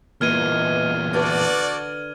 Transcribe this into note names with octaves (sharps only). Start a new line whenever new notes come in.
E2 A#2 A#3 B4 D#5 F6 G#6 D#7
D3 F#4 B4 D5 A5